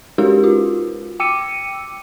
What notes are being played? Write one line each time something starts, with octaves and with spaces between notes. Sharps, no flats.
G#3 C#4 D#4 F#4 G4 A#4
F4 F#4
G5 D6 E6 C#7 D#7